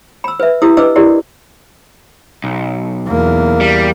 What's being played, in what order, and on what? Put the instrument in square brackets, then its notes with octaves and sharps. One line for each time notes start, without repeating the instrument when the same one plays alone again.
[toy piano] B5 E6
B4 E5
E4 G4 D#6 E6
D4 B4 D#5 D6 E6
E4 F#4 G4 A#4 D5
[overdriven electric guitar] B1
[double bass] E2 A#3
[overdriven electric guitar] G3